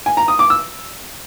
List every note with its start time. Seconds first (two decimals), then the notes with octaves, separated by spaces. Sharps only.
0.06 G#5
0.17 A#5
0.28 D#6
0.39 D6
0.50 E6